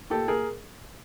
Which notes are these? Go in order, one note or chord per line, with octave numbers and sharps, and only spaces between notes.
A#2 G4 A4
G#4 A#4